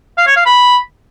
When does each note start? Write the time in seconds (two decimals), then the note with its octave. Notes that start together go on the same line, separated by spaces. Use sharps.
0.17 F5
0.27 C#5
0.36 F5
0.46 B5